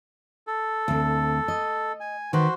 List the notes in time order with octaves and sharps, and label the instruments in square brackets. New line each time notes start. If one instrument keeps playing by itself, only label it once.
[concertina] A4
[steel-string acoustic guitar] D2 C4
D#5
[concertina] G#5
[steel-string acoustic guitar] D#3 B4 [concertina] F#4 C5